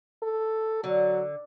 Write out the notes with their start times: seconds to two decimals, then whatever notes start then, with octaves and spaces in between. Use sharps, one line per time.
0.22 A4
0.84 D3 F#3